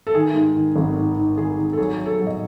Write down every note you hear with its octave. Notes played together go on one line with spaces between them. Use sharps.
A4
D#3 G#4
G#2
D#3
G#1
G#2
D#3
D#3 G#4
D#3
A4
F#3 G#4
F#3
A4
F#3
D#5